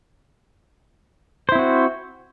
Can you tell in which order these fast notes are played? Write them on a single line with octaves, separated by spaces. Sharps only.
C5 E4 C4 F#4